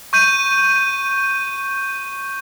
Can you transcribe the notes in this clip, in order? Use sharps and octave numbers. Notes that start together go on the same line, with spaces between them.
C#6 G6 D#7